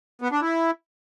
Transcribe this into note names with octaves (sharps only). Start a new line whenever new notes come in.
B3
D4
E4